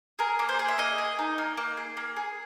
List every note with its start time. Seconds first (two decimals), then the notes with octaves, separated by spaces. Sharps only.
0.19 G#4 A#4
0.39 A#3
0.49 C5
0.59 G#4
0.68 E5
0.78 A#3 D#5
0.98 G#4
1.19 D#4
1.38 A#3
1.57 A#3
1.77 G#4
1.97 A#3
2.16 G#4